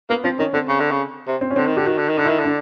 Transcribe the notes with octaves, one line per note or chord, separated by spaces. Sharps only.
A#3 B3
F3 C4
D#3 C#4
D3 C4
C#3
D3
C#3
C3
C4
C#4
D3 C4
D#3
D3 G4
D#3 F#4
D3
D#3
D3 D#4
D#3 E4
D3
D4